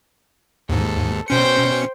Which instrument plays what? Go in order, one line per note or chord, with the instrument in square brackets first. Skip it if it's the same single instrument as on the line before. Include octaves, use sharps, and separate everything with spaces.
[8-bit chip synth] D#2 G#2 [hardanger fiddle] A4
[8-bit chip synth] B2 C#4 C#7 [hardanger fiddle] C5 G5